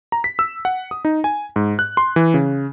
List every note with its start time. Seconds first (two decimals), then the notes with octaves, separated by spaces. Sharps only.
0.12 A#5
0.24 B6
0.39 E6
0.65 F#5
0.91 D#6
1.05 D#4
1.24 G#5
1.56 G#2
1.79 F#6
1.97 C6
2.16 E3
2.34 C#3